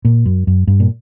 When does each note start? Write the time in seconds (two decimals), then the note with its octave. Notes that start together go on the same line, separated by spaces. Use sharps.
0.05 A#2
0.26 F#2
0.47 F#2
0.67 G2
0.80 A#2